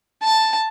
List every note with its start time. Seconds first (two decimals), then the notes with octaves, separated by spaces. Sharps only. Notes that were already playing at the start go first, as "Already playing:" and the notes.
0.23 A5